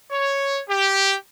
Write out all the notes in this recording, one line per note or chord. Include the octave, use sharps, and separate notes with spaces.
C#5
G4